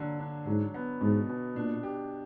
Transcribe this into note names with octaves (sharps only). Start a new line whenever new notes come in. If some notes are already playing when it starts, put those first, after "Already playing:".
Already playing: D3 F#3 A#3
D4
G#2 F#3
B3
G#2 B2
B2
A#2 D4
G4